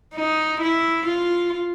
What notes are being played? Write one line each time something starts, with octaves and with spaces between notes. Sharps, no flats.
D#4
E4
F4